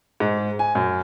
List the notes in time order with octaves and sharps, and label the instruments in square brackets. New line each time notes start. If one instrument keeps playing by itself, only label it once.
[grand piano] G#2
G#5
F#2